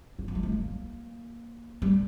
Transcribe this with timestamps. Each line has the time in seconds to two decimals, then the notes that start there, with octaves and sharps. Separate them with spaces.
0.19 A#3
0.28 F3
0.35 G3
0.43 G#3
0.52 A#3
1.82 G3